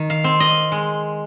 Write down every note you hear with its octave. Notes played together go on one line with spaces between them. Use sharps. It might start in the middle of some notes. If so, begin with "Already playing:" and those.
Already playing: D#3
F5
C4
D#5
G#3